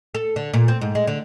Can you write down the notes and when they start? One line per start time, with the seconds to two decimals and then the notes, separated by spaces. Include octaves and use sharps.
0.15 A4
0.36 D3
0.54 A#2
0.68 C4
0.81 G#2
0.95 G#3
1.07 D3